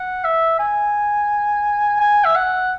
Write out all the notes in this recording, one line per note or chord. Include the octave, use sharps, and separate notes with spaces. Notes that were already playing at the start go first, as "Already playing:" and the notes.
Already playing: F#5
E5
G#5
G#5
E5
F#5